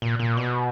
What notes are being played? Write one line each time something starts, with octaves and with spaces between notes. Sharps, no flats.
A#2
A#2
B2